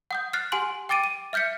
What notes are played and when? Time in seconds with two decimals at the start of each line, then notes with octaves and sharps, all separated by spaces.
0.11 F#5 D#6 G6
0.33 F6 F#6 A6 C7
0.52 G4 F#5 G#5 C6 F#7
0.89 G5 D6 A6 D7 D#7
1.04 D#7
1.33 E5 F6 G6 B6 C#7